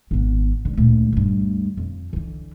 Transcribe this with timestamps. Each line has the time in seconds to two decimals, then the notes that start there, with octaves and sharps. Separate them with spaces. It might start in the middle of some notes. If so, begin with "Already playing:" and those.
0.11 G#1 B3
0.65 C#2 D3
0.77 D2 A#2
1.13 D2 G2
1.77 F2
2.13 D3 E3